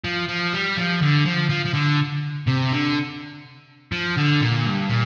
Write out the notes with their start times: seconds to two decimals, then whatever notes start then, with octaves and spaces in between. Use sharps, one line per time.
0.05 F3
0.29 F3
0.53 G3
0.77 F3
1.02 D3
1.26 F3
1.50 F3
1.66 F3
1.74 D3
2.47 C3
2.72 D3
3.92 F3
4.18 D3
4.42 A#2
4.66 G2
4.90 A#2